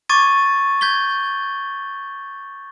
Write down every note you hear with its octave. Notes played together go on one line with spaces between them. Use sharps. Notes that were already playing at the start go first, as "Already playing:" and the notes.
C#6 D6 G#6 A6 D#7
G6 G#6 B6 G7